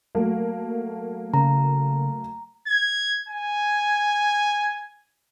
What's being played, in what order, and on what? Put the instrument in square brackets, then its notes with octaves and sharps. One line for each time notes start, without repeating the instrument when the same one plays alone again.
[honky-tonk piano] F#3 A3 A#3
[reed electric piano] C#3 [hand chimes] A#5
[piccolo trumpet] G#6
G#5